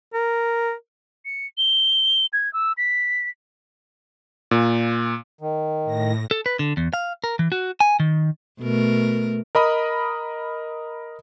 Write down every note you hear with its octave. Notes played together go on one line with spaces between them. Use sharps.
A#4
C#7
G7
G#6
E6
B6
A#2
D#3
A2 A#6
A4
B4
D3
E2
F5
A#4
E3
F#4
G#5
D#3
B2 A3 A#4
A#4 D#5 B5 D#6